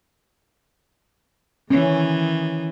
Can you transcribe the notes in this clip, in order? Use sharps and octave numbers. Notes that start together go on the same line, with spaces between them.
D#3 E3 C#4